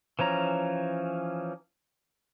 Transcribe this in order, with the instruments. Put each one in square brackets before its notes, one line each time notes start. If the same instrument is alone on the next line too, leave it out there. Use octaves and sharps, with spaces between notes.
[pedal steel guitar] E3 F3 C#4 A#5